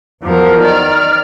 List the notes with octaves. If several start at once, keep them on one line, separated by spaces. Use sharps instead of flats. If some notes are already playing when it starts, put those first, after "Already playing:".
E2 F3 F#3 A#4
D#3 D5 F6